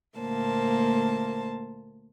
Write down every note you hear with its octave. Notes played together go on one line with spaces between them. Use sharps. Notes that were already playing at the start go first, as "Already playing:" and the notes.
D2 A#2 A#3 C5 A5